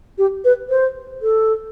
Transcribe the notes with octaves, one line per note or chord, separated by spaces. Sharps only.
G4
B4
C5
A4